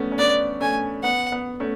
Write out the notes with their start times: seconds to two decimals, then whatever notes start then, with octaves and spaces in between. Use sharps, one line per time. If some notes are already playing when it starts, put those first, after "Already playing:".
Already playing: A3 B3 C#4
0.12 C#4
0.18 B3 D4 D5
0.60 A3 C#4 G#5
1.03 B3 F#5
1.32 B3
1.60 A3 C#4